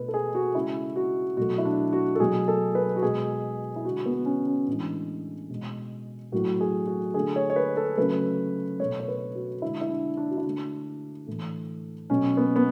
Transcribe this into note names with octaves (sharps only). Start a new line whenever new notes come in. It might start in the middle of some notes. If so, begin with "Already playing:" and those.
Already playing: B2 A3 B4
A4
G#4
F#4
C#3 G#3 E4
F#4
B2 F#3 A3 F#4
E4
D4
F#4
A4
B2 F#3 A3 G#4
A4
B4
F#4
B2 G#3 G#4
E4
D3 G#3 F#4
B3
C#4
C#4
A2 E3 G#3 D4
B2 G#3
A2 F#3 A3 F#4
G#4
F#4
D3 A3 G#4
C#5
C#5
B4
A4
C#3 F#3 A3 B4
B2 A3 C#5
C#5
B4
F#4
D3 G#3 E4
E4
D4
D4
F#4
E4
D3 A3 D4
A2 E3 A3
B2 F#3 A3 C#4
B3
B3